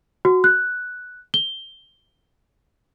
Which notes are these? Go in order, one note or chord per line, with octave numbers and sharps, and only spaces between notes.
F#4
F#6
G7